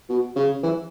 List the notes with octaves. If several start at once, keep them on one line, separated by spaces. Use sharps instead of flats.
B2
C#3
E3